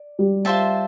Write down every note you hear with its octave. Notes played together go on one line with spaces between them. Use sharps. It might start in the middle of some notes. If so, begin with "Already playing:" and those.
Already playing: D5
G3
F4 C5 E5 A5